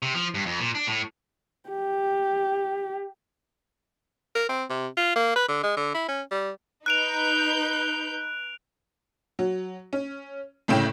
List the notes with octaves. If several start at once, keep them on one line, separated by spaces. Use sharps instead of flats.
C3
F3
G2
F2
A#2
D4
A2
G4
A#4
C4
C3
F4
A#3
B4
D3
G#3
D3
E4
C#4
G3
D#4 B4 F#6 G6 D7 F7
F#3
C#4
G1 A2 C#3 E4 G5 E7